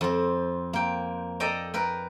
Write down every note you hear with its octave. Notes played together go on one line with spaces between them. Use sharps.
F2 C4
A#3 G5
A4 D5 D#5 G5 A#5
A#4 B4 G5